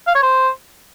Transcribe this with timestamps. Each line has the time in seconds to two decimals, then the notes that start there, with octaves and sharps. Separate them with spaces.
0.07 F5
0.15 C#5
0.23 C5